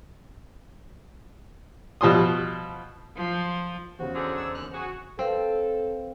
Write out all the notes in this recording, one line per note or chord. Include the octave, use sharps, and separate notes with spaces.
B2 F3 G3 C6 D#6
F3
E2 C#3 F#4 C5
G#2 D3 G#4
E6
D#2 F6 F#6
F#4 G#4
C4 A4 B4 F5 G5